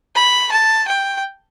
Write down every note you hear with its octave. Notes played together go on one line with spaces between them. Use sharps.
B5
A5
G5